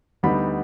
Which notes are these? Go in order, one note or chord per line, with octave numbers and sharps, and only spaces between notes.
D2 D3 G3 B3 D#4 B5